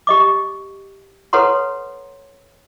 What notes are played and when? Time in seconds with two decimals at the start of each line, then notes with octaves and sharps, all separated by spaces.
0.07 G4 D#5 D6
1.33 A4 B4 C#5 F#5 A#5 C6